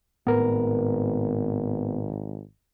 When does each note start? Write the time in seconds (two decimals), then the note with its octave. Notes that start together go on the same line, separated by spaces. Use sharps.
0.27 G#1 A2 B3 A#4 B4